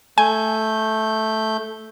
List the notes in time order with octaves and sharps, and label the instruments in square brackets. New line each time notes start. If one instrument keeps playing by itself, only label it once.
[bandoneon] A3 G6 [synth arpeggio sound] G#5